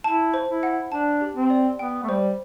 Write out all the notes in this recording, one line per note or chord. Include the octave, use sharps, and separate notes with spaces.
E4 A5
C5
E4
F#5
D4 A5
G4
C4
D5
B3 G5
A3
G3 C5